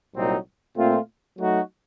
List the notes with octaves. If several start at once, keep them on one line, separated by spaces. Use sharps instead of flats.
C2 A#2 F#3 C4 D#4
A#2 A3 C4 F4
F#3 A3 D#4 F#4